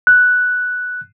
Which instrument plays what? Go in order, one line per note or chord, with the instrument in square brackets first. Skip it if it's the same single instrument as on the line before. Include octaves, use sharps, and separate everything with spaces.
[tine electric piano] F#6